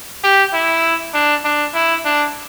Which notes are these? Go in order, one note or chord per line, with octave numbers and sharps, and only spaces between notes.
G4
E4
D4
D4
E4
D4